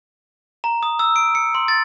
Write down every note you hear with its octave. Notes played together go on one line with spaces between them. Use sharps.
A#5
D#6
E6
D7
C#7
C6
A6